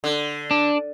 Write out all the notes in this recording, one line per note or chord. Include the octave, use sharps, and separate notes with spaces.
D3
D4